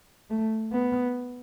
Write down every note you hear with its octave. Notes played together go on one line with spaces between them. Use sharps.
A3
B3